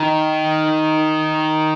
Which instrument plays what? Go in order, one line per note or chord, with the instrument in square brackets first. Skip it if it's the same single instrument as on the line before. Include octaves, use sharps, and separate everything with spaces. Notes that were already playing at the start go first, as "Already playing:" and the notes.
Already playing: [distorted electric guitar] D#3